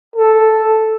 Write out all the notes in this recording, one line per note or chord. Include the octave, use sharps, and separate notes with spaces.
A4